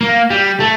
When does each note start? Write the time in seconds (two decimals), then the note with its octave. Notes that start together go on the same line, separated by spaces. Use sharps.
0.01 A#3
0.30 G3
0.60 A3